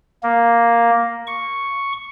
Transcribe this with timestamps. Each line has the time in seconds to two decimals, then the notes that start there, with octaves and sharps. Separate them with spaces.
0.23 A#3
1.27 C#6